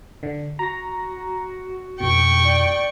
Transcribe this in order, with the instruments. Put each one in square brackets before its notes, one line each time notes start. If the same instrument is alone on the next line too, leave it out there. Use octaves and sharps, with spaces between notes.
[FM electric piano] D3
[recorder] F#4 [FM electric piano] A#5 A#6
[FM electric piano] F2 B2 [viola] G5 C#6
[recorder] D5